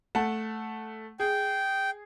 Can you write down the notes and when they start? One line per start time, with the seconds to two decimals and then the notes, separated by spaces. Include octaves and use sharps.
0.15 A3 F#5 A5
1.20 G#4 G5